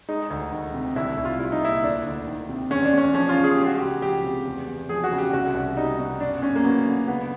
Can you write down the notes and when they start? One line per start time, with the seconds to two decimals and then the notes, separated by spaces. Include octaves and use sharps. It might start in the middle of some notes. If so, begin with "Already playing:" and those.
0.08 G#3 D#4
0.30 D2
0.52 D#3
0.74 C3
0.96 C2 E4
1.17 C2
1.25 F4
1.39 G3 E4
1.52 D#4
1.61 A#2 E4
1.83 D2 D4
2.06 D2
2.27 D#3
2.49 C3
2.70 E2 C#4
2.85 D4
2.93 E2 C#4
3.14 F3 C#4
3.29 F4
3.36 C#3
3.44 G#4
3.55 G#3 G4
3.67 F#4
3.78 C#2 G4
4.02 F3 G4
4.24 C3
4.46 E2
4.68 E2
4.89 F3 G#4
5.04 F#4
5.12 C#3
5.18 G4
5.33 C2 F#4
5.55 C2
5.77 G3 D#4
5.99 B2
6.20 F#2 D4
6.42 F#2 C#4
6.56 A#3
6.64 F#3 B3
6.86 D3
7.08 C#2 B3